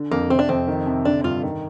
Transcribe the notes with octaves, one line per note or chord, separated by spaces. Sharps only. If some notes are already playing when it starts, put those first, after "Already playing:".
Already playing: D3
F2 A#3
C3 C4
D4
F2 C4
D#3
C3
D3 D4
G2 F4
D#3